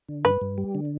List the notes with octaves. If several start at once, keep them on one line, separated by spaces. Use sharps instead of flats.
D3
G2 B4
G2
G3
D3